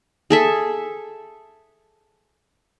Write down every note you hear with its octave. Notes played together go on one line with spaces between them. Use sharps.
G#4 A4 E5